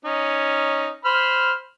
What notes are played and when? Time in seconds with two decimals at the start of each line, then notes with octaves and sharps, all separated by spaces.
0.05 C#4 D#4
1.05 C5 B5 F6